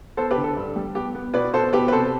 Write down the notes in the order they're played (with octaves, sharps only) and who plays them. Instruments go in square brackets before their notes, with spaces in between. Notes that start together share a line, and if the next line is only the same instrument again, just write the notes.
[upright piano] B3 A4 C5
G4 B4
D3
A4
G2
G3
B3 G4
B3
B2 B4 D5
B2 A4 C5
B3 G4 B4
B4
C3 A4 C5